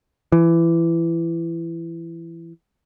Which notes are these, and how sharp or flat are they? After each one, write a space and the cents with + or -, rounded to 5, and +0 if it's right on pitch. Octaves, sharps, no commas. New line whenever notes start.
E3 +20